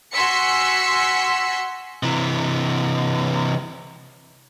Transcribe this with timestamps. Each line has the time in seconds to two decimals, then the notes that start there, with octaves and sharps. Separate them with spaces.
0.12 F#4 G#5 C6 E6 B6 C#7
2.03 C3 E3